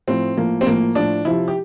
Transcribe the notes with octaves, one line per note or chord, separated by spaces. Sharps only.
A2 F3 C4
A2 F3 A#3
C4
A2 F3 A#3
A2 F3 D4
C3 F3 E4
G4